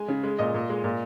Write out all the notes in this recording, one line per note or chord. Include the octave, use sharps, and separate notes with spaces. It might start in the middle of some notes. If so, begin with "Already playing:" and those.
Already playing: G#3 G#5
C#3
G#3
A#2 D#5
A#2
G#3
A#2